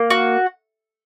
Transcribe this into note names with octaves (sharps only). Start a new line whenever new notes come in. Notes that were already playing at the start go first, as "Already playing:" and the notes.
Already playing: A#3
F#4